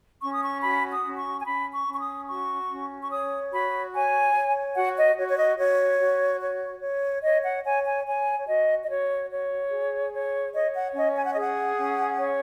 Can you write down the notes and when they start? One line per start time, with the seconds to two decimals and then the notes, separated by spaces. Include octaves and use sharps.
0.22 C#4 C#6
0.32 D#6
0.43 C#6
0.63 F#4 B5
0.91 D#6
1.04 C#4
1.18 C#6
1.40 G#5
1.46 C#4 B5
1.73 C#6
1.87 C#4
1.94 C#6
2.01 D#6
2.28 F#4 C#6
2.70 C#4
3.02 C#6
3.10 C#5 D#6
3.52 F#4 B5
3.93 C#5 G#5
4.34 C#5
4.75 F#4 F#5
4.96 D#5
5.17 F#4 C#5
5.29 C#5
5.38 D#5
5.58 F#4 C#5
6.00 F#4
6.41 C#5
6.82 C#5
7.23 C#5 D#5
7.44 F#5
7.64 C#5 G#5
7.85 G#5
8.06 C#5 G#5
8.38 C#5
8.47 F#4 D#5
8.83 D#5
8.88 F#4 C#5
9.29 C#5
9.71 G#4
10.13 C#5
10.53 C#5 D#5
10.74 F#5
10.94 C#4 D#5
11.15 G#5
11.25 F#5
11.34 G#4 D#5
11.42 F#5
11.77 C#4
12.18 C#5